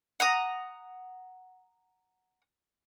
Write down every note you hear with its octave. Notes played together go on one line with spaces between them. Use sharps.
F#5 A#5 D#6